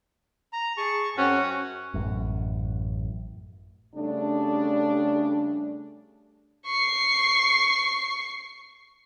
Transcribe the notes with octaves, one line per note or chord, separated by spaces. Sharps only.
A#5
G#4 A5 C#6
F#2 C4 C#4 F#4 F#5
A1 F#2
C#3 G3 A3 D4
C#6 C7